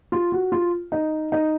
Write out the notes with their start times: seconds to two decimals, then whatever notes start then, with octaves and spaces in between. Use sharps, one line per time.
0.12 F4
0.32 F#4
0.52 F4
0.92 D#4
1.32 D#4